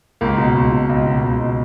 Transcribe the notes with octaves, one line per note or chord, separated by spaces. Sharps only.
C#2 A#3
B2
C#2
B2
C#2
B2
C#2
B2